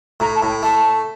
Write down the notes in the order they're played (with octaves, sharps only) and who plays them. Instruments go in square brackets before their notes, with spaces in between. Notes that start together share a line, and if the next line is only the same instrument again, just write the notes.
[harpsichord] A2 [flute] A#5
[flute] A5
[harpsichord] A2
[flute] G5
[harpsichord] A3 [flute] A5